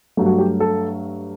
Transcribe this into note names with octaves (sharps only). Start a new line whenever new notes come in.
G2 F#3 A3
F#4
G4
A4